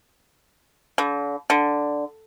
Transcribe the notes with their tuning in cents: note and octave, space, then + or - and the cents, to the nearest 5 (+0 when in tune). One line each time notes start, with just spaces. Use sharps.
D3 -40
D3 +0